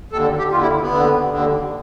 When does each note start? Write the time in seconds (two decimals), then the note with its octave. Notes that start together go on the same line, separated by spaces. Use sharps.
0.12 D#2 A4
0.17 D3
0.38 G4
0.52 D#2 D3 F4
0.62 E4
0.82 B3
0.91 D#2 D3
1.31 D#2 D3